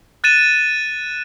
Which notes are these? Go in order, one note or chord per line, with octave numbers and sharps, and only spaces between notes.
F#6 A6 D#7 E7